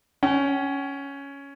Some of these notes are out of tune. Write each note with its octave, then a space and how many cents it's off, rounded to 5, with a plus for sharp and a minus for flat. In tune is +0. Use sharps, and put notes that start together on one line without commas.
C#4 +5 G5 -45